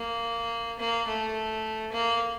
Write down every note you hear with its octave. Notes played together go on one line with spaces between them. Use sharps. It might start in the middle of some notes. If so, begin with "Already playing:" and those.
Already playing: A#3
A#3
A3
A#3